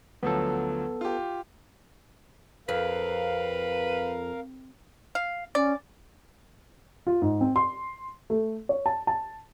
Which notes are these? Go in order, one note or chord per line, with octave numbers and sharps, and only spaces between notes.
D2 F3 F#3 B3 A4
F4 G4
F2 A#4 B4 F5
F5
C#4 D5
F4
G#2
C4
C6
A3
C#5
A5
A5